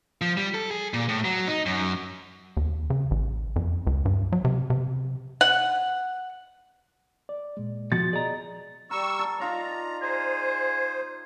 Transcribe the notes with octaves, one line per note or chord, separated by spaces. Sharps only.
F3
G3
A4
G#4
A#2
A2
F#3
D#4
F#2
D#2
C#3
A1
F2
C#2
G2
F#3
C3
C3
F#5
D5
A#2 G#3
B2 F3 F#4 A6
G#4 D5 D#5 A#5
G3 A#4 C#6 E6
A4
D#4 F4 D5 A#5
G#4 C5